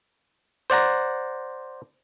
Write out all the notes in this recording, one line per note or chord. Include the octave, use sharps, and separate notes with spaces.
C5 D5 F#5 A#5